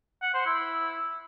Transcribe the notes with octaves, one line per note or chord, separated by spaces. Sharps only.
F#5
C5
E4